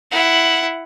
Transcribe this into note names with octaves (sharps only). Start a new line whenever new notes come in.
E4 F#5